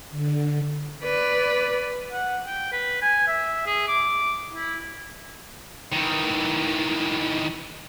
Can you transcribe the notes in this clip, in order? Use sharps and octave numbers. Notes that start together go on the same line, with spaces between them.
D3
B4 D5
F#5
G5
B4
G#5
E5
G#4
D6
E4
D#3 E3